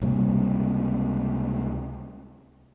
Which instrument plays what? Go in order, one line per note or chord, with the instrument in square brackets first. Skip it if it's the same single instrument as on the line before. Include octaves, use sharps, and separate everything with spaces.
[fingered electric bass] C#2 C3 G3 A#3